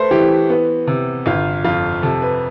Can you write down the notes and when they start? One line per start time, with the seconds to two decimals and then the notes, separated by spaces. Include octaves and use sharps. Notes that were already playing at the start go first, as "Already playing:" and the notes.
Already playing: A3 B4 C5
0.11 E3 G4
0.49 B3
0.87 C3
1.26 G1 F4
1.65 F2 F4
2.02 C3 A4
2.22 B4